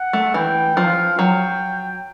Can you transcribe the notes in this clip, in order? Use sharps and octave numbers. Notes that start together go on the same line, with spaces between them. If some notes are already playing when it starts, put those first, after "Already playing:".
Already playing: F#5
A3
E3 G5
F3 F5
F#3 G5